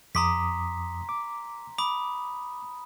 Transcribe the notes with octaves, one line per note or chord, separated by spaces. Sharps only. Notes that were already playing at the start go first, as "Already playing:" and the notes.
F2 A#5 C6 D6 D#6 B6
D6
B5 D6 D#6